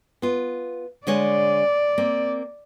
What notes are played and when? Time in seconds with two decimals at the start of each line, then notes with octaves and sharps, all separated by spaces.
0.22 B3 F4
1.07 D3 G#3 C#5 D5
1.98 A#3 C4